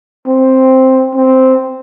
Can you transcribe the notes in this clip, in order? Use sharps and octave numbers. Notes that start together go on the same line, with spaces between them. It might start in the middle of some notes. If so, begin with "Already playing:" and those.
C4
C4